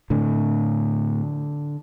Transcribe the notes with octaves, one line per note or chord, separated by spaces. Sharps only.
A2 D3